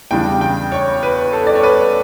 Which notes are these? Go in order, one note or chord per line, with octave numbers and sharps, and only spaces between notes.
E2 C#3 G3 D4 G5
G5
C#5
B4
A4
D5
C#5
B4